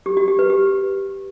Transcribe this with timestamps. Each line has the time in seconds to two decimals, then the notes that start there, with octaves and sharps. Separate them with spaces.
0.06 G4
0.17 F#4
0.28 G4
0.39 B4
0.50 G4